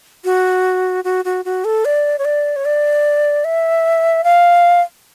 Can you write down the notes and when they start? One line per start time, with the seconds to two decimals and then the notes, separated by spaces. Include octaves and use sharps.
0.25 F#4
1.04 F#4
1.25 F#4
1.45 F#4
1.65 A4
1.85 D5
2.18 C#5
2.25 D5
2.56 C#5
2.65 D5
3.44 E5
4.24 F5